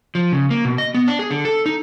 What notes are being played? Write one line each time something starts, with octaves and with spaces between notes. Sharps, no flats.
F3
C#3
A#3
B2
D#5
B3
D4
G#4
D3
A4
D#4